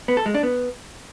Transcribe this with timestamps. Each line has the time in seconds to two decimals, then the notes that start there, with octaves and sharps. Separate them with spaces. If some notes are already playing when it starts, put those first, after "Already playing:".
0.08 B3
0.17 A4
0.26 G#3
0.34 D4
0.43 B3